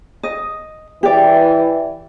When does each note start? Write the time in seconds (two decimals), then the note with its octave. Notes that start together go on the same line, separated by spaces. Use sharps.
0.23 D#5
1.03 E3 G4 D5